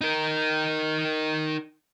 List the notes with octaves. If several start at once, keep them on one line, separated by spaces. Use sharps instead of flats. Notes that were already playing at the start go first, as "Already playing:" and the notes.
D#4 A#4